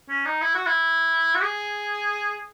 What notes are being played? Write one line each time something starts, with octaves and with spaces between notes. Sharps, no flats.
C#4
D#4
E4
F#4
E4
F#4
G#4